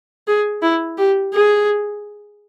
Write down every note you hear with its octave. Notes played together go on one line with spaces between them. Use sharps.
G#4
E4
G4
G#4